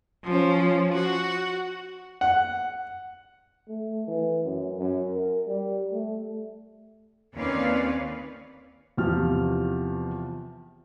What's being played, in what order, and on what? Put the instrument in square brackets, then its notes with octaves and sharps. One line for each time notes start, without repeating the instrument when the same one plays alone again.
[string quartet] F3 C#4
F#4
[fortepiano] F#5
[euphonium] A3
E3
F#2
F#2
A#4
G3
A3
[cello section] D#2 C4 C#4 B4 D5 F5
[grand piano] E2 C3 F3 F6